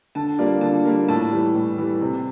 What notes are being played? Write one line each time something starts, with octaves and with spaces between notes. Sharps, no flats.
D3 A5
G3 A#3 F4 D5
D3 A5
G3 A#3 F4
A2 A5
E3 G3
A2
E3 G3
C3